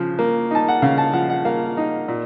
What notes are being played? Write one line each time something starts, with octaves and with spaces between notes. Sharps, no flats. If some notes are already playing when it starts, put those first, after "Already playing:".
Already playing: C#3 F3
A#3
D#4 A5
F#5
C#3 F5
A5
F3 F#5
F#5
A#3 F5
D#4
A#2